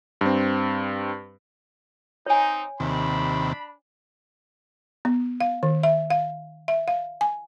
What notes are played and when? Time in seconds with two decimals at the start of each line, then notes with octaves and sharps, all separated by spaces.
0.21 G2 C4
2.26 C4 D#4 C#5 G#5
2.80 D#2 C3 D4 B5
5.05 B3
5.41 F5
5.63 D#3
5.83 E5
6.10 F5
6.68 E5
6.88 F5
7.21 G#5